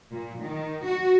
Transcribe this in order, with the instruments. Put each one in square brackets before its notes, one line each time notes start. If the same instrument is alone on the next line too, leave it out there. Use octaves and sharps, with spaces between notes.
[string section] A#2
D#3
F#4